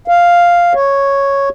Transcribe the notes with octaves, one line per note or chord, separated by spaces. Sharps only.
F5
C#5